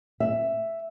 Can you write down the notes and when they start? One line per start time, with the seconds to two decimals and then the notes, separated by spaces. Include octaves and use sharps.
0.20 E5